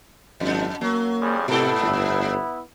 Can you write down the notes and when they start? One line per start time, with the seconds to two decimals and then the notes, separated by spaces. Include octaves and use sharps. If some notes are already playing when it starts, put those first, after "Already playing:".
0.40 G#1 F2
0.81 F#3 A#3
1.20 F2 G3 G#4
1.48 G#2 C3 B3 E4 A4
1.83 G1